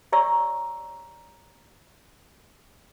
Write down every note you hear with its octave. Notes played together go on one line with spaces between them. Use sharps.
G4 C#5 D5 A#5 C#6 E6